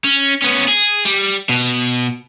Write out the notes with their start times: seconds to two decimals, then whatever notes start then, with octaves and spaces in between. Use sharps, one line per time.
0.04 C#4
0.42 B3 C#4
0.68 G#4
1.05 G3
1.49 B2